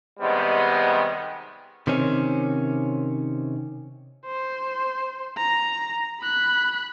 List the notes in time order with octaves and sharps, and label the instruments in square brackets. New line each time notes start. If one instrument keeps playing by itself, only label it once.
[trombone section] C3 D#3 G3 G#3 B3
[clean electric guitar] C3 D#3 C4 C#4
[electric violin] C5
A#5
B5 F#6